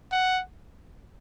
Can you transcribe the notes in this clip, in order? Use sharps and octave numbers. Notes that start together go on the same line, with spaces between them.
F#5